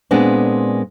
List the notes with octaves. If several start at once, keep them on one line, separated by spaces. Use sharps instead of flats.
A#2 G#3 B3 C4 D4